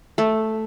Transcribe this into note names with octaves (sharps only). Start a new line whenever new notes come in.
A3